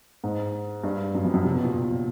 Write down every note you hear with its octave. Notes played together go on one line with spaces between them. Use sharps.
G#2
G2
F#2
F2
F#2
C3
B2
A#2